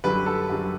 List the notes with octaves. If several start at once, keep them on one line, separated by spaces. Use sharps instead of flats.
F#2 D3 G3 B4
A4
F#2 D3 G3